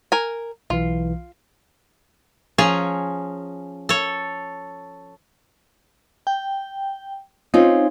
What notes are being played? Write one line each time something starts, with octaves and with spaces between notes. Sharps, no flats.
A#4 G#5
B1 E3 F4
F3 C#4 G#4 A#5
A4 C#5
G5
C4 C#4 D#4 F4